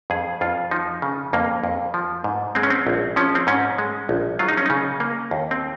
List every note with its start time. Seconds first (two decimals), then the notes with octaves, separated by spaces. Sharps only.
0.10 F2 G#4
0.41 F2 F4
0.71 F3 D#4
1.02 C#3
1.33 F2 A#3
1.64 F2
1.94 F3
2.24 G#2
2.55 G#3 C4
2.63 C#4
2.70 C4
2.87 A#1
3.16 F3 C#4
3.35 C4
3.47 G#2 C#4
3.78 G#3
4.09 A#1
4.39 F#3 F4
4.49 D#4
4.57 C#4
4.66 C#3 D#4
5.00 A#3
5.31 D#2
5.51 C4